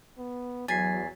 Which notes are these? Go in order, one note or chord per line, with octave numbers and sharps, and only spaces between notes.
B3
E2 F#3 G#5 A6 B6 C7